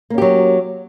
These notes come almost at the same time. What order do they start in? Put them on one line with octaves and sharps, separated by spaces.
A#3 C#4 G4 F#3